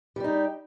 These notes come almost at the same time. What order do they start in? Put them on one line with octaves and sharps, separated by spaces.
G3 G4 D#4